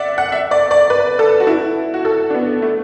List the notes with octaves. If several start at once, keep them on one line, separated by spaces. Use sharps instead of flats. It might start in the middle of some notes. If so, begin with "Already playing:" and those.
Already playing: D5 E5 F#5
F#5
E5
D5
D5
B4
A4
F#4
E4
F#4
A4
D4
B3
A3